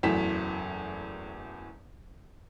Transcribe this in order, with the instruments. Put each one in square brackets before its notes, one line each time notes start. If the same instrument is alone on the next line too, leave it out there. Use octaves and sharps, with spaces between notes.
[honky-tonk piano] F#1 E2 A2 F#3 B6 E7